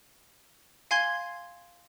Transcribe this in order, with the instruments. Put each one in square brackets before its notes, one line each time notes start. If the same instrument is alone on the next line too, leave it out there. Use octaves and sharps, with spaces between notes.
[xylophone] F5 G#5 C6 G#6 C7 G7